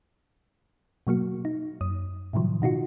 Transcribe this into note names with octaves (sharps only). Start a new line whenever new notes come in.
B2 F#3 A#3 F#4
D#4
F#2 D#6
A2 C3 D#3 F3 F#3
B2 D#4 F4 F#4